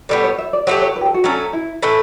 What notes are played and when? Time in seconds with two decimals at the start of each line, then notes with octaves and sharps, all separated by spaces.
0.09 A2 G3 B3 D5
0.24 C#5
0.38 E5
0.53 D5
0.67 F#3 A3 E4 G4 C#5
0.82 C#5
0.96 B4
1.01 G4
1.05 A4
1.14 F#4
1.24 F#3 A3 C#4 D4
1.53 E4
1.82 A2 E3 A3 E4